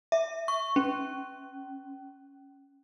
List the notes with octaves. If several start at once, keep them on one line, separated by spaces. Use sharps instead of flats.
E5
C#6
C#4